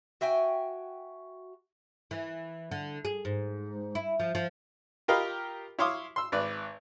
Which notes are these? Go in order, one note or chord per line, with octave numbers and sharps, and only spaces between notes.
F#4 E5 G5 G#5
E3
D3
G#4
G#2
E4
F3
F3
F4 G4 A#4 D#5 F5 B5
E4 C#5 F5 C6 D6 D#6
C6 E6
G#1 B4 D5